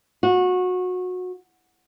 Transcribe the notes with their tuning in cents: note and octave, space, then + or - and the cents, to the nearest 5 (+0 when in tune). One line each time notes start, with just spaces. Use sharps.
F#4 -25